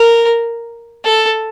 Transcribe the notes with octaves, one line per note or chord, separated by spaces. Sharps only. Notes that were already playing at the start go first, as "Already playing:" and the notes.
Already playing: A#4
A4